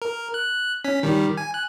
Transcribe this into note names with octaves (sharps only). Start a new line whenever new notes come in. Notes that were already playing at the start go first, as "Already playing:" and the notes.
A#4
F#6
C#4 B6
D#3 G3
G#5
F#6